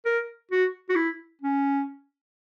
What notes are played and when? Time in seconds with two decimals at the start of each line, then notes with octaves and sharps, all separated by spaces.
0.05 A#4
0.51 F#4
0.89 F#4
0.96 E4
1.42 C#4